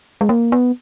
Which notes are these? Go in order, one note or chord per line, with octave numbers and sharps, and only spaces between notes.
G#3
A#3
B3